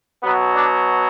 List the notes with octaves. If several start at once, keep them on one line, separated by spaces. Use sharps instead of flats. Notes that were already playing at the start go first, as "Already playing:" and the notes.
B2 F#3 B3
D4